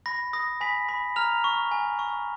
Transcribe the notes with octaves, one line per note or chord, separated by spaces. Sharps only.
B5 A#6
D#6 A#6
G#5 B5 B6
B5
A#5 F6 F7
C#6
G#5
C#6